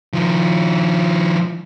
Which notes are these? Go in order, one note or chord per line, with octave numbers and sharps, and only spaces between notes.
D#3 F3